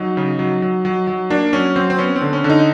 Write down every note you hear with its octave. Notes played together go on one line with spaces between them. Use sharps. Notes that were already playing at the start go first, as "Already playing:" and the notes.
Already playing: F#3 D#4
C#3
F#3
F#3
F#3
F#3
A#3 D4
F#3 C#4
F#3 C4
C4
B3 C#4
C4
D3
C#4
D3
D#4